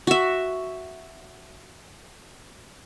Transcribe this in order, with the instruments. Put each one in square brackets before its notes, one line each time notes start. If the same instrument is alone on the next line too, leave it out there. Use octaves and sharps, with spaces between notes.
[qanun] F#4 E5